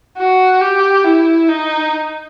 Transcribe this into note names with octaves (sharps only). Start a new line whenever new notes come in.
F#4
G4
E4
D#4